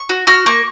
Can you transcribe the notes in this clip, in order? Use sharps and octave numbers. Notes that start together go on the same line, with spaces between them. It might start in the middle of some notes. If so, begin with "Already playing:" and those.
Already playing: C#6
F#4
F#4 F6
A#3 C#6